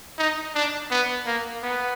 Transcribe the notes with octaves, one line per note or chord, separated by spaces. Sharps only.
D#4
D4
B3
A#3
B3